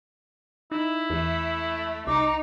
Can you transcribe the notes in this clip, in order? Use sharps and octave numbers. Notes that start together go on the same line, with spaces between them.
D#4 E4
E2 A3
C2 D#4 D6